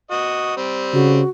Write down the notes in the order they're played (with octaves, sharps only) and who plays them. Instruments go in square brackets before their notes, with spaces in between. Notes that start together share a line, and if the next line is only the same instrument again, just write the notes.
[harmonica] F#4 D#5
G3 C4
[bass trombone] C#3 [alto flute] F#4